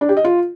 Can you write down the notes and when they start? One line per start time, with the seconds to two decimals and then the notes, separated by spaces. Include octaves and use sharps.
0.01 D4
0.09 G4
0.17 D#5
0.24 F4